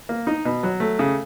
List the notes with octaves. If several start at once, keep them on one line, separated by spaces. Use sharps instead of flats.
A#3
D#4
B2
F#3
A3
C#3